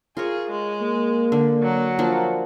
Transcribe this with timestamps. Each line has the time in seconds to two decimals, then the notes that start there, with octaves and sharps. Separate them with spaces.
0.17 F4 G#4 A#4 C#5
0.50 G#3
0.82 A#3
1.32 D3
1.63 F#3
1.99 F3 A#3 D4